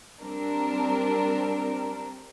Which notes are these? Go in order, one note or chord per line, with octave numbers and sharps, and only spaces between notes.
G3 C4 D4 A#4